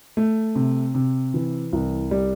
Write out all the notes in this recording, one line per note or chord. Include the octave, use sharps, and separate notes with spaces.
A3
C3
C3
E3
C2
G3